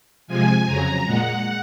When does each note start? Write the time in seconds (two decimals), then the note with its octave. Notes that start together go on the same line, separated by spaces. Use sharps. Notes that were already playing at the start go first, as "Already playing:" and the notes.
0.27 C3 F3 G#3 G#5
0.66 F2 C#3 F#3 A#5
1.04 A#2 G#3 F#5